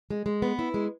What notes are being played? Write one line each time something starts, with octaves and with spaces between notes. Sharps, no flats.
G#3
G#3
B3
E4
G#3